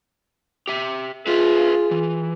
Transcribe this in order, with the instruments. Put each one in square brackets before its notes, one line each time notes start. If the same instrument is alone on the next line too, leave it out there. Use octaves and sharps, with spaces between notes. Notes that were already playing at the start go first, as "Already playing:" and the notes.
[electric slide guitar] G4 E5
[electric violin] F4 [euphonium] G#4 [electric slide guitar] B4 E5 F5
[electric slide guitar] E3